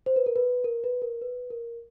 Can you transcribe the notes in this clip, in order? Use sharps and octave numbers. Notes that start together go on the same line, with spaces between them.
C5
B4
A#4
B4
A#4
B4
A#4
B4
A#4